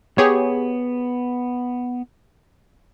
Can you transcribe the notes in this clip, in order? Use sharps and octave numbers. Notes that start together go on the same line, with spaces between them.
B3 G4 G#4 C#5